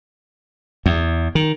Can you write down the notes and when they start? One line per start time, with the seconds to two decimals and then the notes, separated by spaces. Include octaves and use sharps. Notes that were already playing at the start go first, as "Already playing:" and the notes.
0.86 E2
1.35 D#3